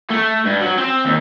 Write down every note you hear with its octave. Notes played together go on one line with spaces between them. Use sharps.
A3
G2
F#3
C4
D#2